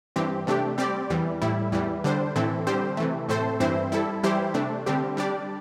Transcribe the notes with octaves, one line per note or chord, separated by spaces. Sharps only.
G2 E3 C4 G4
C3 A3 D4 G4
G3 C4 G4 D5
E2 E3 G3
A2 G3 E4
E2 E3 G3
D3 G3 D4 C5
A2 E3 C4 E4 A4
D3 G3 C4 G4 C5
C3 E3 A3
A2 A3 C4 A4 C5
G2 E3 C4 E4 C5
G3 E4 A4
E3 G3 E4 G4 C5
C3 A3 D4
D3 G3 C4 G4
G3 D4 G4 D5